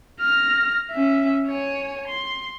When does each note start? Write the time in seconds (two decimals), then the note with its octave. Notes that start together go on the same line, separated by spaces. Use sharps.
0.20 F6 A#6
0.91 C#4 E5
1.48 C#5 G#5
2.08 C6